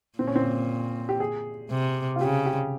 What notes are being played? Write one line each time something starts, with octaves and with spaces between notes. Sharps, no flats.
A#2 C4
C#4
C4
G4
G#4
C3
F4
C#3 G4
G4